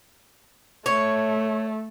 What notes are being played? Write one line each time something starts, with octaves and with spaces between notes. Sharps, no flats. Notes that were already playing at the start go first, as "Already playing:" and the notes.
A3 C#5